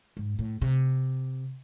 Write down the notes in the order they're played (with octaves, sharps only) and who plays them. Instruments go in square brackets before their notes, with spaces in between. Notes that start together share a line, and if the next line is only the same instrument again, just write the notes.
[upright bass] G#2
A2
C3